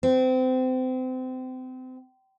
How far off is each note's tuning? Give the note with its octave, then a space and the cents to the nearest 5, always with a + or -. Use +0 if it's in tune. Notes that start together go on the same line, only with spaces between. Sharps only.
C4 -30